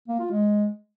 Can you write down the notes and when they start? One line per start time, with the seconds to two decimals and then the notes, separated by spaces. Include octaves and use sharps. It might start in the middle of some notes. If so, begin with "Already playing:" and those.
0.08 A#3
0.19 F4
0.31 G#3